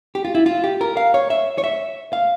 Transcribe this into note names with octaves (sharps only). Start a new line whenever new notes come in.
G4
F4
E4
F4
G4
A#4
F5
C#5
E5
C#5
E5
F5